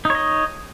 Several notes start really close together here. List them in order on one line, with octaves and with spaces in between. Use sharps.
D#4 C#5 D#5